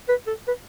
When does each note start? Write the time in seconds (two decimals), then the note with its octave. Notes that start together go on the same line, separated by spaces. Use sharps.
0.09 B4
0.27 A4
0.48 B4